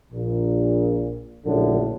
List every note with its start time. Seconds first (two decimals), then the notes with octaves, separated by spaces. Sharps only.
0.12 A#1 A#2
1.45 A#1 F#2 A2 D3